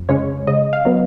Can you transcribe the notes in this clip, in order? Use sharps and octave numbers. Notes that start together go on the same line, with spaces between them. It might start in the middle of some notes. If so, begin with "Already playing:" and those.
Already playing: F2
C#3 G#3 C#4 C#5
C#3 D#5
F5
F#3 B3